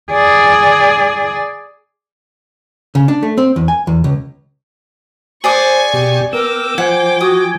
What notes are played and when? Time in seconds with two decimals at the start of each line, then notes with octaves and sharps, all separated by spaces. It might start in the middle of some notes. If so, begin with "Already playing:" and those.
0.11 G#4 D5
2.95 C#3
3.08 D4
3.23 A3
3.38 C4
3.56 E2
3.68 G#5
3.87 E2
4.04 C#2
5.44 G#4 C5 D5 G#5 C#6 D6
5.93 B2 G4
6.33 B3 A#4 G5 D6 E6
6.78 F3 C5 F#5 G#5
7.21 F#4 D#6